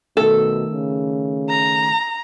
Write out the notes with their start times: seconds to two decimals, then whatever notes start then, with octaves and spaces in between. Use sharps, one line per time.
0.17 B2 D#3 A3 A4
0.73 C#3
1.50 A#5